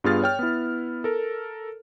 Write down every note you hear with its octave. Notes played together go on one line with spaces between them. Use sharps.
G2 B3 F4 G#4 F6 A6
C#5 G5 F6
B3 E4
A4 A#4